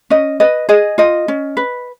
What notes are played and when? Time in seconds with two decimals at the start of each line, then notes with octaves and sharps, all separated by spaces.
0.10 C#4 D#5
0.40 B4 D#5
0.69 G#4 D#5
0.98 F4 D#5
1.28 C#4
1.57 B4